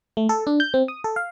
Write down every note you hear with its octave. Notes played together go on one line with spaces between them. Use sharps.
A3
A4
D4
G6
C4
D#6
A4
F5